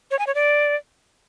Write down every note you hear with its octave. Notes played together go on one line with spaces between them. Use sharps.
C#5
G#5
C#5
D5